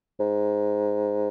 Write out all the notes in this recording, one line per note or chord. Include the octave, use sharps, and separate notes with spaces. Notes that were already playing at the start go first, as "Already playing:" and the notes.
G#2